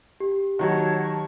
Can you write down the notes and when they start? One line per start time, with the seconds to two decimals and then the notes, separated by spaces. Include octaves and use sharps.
0.20 G4
0.59 D#3 F#3 F#4 C#5 F#5 A5
1.01 A5 C#6